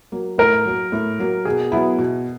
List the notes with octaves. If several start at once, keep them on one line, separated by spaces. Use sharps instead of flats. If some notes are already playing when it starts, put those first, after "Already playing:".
F#3 A#3
A2 A#4
F#3 A#3
A2
F#3 A#3
B2 G#4
F#3 B3 E4
B2